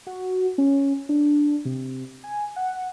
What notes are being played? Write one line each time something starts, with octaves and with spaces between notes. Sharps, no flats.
F#4
C#4
D4
C3
G#5
F#5